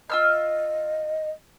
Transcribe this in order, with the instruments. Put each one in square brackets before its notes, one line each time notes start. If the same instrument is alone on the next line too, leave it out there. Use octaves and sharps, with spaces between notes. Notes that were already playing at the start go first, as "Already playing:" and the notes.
[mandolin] F4 E6 F6 [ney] D#5